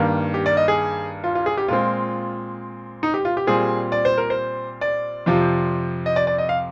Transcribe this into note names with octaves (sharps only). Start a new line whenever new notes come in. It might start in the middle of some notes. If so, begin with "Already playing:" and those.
Already playing: G2 D#3 A#3
G4
D5
D#5
G#4
F4
F4
G#4
G4
A#2 G#3 C4 F4
D#4
G4
F4
G4
A#2 G3 C4 G#4
D5
C5
A#4
C5
D5
F2 C3 F3
D#5
D5
D5
D#5
F5